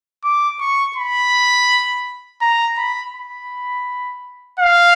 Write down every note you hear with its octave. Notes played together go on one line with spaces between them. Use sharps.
D6
C#6
B5
A#5
B5
B5
F5